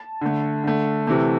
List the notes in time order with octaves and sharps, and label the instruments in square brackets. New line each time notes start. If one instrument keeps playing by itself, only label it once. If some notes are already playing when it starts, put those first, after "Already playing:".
Already playing: [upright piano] A5
D3 A3
D3 A3
C3 E3 A3